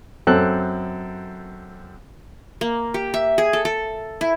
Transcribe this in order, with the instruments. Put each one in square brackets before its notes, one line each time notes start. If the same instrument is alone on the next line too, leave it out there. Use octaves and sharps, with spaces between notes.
[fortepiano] F#2 C4 A4 F#6
[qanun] A#3
G4
E5
G#4
A4
A4
E4